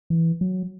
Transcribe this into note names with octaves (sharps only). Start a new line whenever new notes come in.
E3
F#3